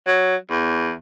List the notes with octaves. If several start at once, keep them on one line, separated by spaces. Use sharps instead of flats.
F#3
E2